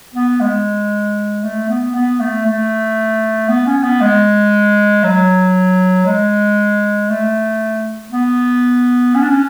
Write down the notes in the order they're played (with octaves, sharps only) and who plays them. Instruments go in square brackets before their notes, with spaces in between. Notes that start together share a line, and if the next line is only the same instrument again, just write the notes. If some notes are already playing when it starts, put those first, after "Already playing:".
[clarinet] B3
G#3
A3
B3
B3
A3
A3
B3
C#4
B3
G#3
F#3
G#3
A3
B3
C#4
D4
C#4